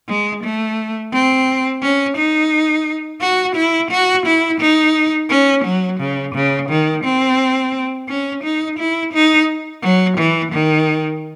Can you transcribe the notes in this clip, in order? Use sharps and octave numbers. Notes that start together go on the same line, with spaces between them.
G#3
A3
C4
C#4
D#4
F#4
E4
F#4
E4
D#4
C#4
F#3
C#3
C#3
D#3
C4
C#4
D#4
E4
D#4
F#3
E3
D#3